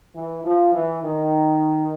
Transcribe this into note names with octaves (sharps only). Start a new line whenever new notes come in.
E3
F3
E3
D#3